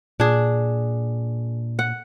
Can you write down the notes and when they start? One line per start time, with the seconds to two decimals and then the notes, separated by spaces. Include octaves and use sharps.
0.20 A#2 D4 G#4
1.79 F#5